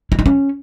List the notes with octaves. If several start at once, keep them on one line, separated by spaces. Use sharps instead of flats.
E4
D#4
C#4